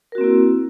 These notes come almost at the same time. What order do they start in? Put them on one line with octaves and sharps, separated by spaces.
A#4 F#4 C4 A#3 E4